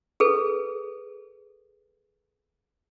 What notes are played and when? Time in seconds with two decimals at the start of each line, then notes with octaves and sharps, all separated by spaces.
0.20 G#4 A4 B4